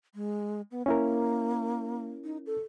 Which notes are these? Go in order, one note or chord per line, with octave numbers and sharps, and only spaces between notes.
G#3
B3
A#3 C#4 E4 A#4
D#4
A4